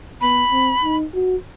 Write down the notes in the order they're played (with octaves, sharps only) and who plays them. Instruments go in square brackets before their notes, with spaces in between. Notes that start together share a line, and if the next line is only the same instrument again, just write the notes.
[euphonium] B3 [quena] B5
[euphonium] C4
D#4
F#4